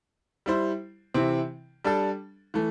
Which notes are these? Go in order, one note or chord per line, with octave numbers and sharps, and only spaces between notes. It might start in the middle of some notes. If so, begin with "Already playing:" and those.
G3 E4 C5
C3 E3 C4 E4
G3 D4 A4
E3 A3